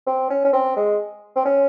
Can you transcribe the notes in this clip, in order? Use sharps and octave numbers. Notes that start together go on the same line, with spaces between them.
C4
C#4
C#4
C4
G#3
C4
C#4